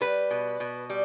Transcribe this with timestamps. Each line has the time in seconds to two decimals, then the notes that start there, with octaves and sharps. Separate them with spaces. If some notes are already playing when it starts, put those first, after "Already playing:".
0.01 G3 B4
0.31 B2
0.60 B2
0.90 G3